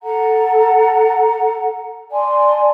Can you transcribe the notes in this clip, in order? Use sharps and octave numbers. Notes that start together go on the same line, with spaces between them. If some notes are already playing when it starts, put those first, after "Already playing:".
A4 F#5 A#5
D5 G#5 A5 C6